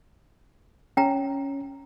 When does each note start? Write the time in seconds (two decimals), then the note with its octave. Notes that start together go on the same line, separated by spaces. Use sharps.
0.97 C#4 G5 A#5